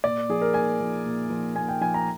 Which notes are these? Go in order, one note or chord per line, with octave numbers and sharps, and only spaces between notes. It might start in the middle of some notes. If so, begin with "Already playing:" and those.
A#2 D5
F3 G#4
A#4
A#2 G#5
F3
A#2
F3
A#2 G#5
G5
F3 G#5
A#5